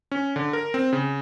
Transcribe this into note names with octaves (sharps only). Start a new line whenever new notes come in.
C#4
D3
A#4
C4
C#3